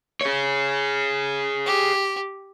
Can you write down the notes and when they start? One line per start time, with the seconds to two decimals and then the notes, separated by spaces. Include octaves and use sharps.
0.21 G#4 C#5
1.66 G4